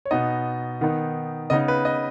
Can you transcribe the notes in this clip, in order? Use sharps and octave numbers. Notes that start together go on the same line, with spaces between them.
C#5
B2 B3 D#4 D#5
D#3 B3 D#4
C#3 B3 D#4 D#5
B4
D#5